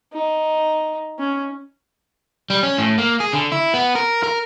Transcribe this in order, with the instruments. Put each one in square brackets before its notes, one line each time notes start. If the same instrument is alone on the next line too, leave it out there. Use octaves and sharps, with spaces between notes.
[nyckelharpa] D#4
C#4
[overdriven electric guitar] G3
C#4
A2
A#3
G#4
D3
E4
B3
A#4
A#4